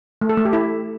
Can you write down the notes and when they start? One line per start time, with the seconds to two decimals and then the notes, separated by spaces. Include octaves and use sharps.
0.21 A3
0.29 A4
0.37 A3
0.45 G4
0.53 E4